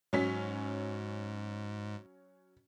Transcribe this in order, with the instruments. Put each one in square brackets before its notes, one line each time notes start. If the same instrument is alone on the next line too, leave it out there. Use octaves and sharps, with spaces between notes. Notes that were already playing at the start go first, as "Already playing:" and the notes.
[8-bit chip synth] G#2 [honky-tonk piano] F#3 C#4 B6